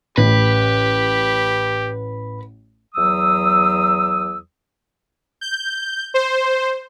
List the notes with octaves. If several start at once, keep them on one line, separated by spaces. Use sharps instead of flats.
A1 G4 B4
E2 F#3 D#6 E6
G6
C5